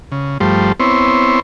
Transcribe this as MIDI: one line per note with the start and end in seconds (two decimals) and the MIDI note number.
0.12 0.38 49
0.40 0.72 43
0.40 0.72 53
0.40 0.72 55
0.40 0.72 57
0.40 0.72 72
0.80 1.40 59
0.80 1.40 60
0.80 1.40 64
0.80 1.40 72
0.80 1.40 73